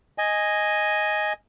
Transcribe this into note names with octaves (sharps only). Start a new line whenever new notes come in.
D#5 G#5